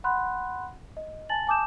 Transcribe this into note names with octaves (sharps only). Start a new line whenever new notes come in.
F#5 B5 C6 F#6
D#5
G#5 A5 A6 F#7
G#5 A5 D6 D#6 G6 E7